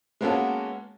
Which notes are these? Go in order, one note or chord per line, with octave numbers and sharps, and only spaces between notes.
G#3 A#3 B3 C#4 F#4 A4